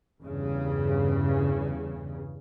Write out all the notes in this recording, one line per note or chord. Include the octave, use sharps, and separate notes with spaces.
E2 G2 C#3